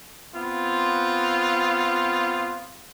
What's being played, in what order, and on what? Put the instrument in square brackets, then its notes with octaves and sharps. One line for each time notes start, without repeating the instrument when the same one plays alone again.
[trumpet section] B3 C4 F4